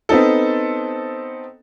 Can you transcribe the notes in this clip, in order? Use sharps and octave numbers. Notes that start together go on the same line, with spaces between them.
B3 C4 D#4 A4